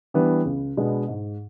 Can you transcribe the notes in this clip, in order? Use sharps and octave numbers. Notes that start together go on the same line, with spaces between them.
E3 G3 B3 D4
C#2
B2 G#3 B3 D4
G#2